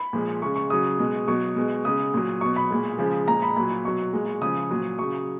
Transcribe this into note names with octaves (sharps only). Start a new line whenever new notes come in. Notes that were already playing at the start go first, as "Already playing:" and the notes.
Already playing: B5
A#2 F3 G#3
C#3 G#3 C#6
C#6
C#3 F#3 D#6
B2 G#3
B2 F#3 C#6
B2 G#3
C#3 G#3 D#6
A#2 F#3
B2 F#3 C#6
B5
A#2 G#3
C#3 F3 G#3
A#2 G#3 A#5
B5
A#2 F#3 B5
B2 F#3 C#6
A#2 G#3
C#3 F3 G#3 D#6
A#2 F#3
C#3 F#3 C#6